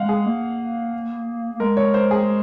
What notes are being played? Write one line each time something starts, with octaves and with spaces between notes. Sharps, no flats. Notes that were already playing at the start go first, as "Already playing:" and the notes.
Already playing: G#3 F5 F#5
G#4
A#3
A#3
G#3 A#4
C#5
C5
G#4